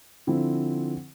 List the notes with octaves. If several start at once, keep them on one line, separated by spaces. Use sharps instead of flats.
D3 F3 C4 E4